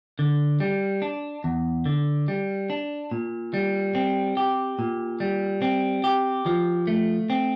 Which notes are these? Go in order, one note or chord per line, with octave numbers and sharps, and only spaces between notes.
D3
G3
D4
E2
D3
G3
D4
A#2
G3
C4
G4
A#2
G3
C4
G4
F3
A3
C4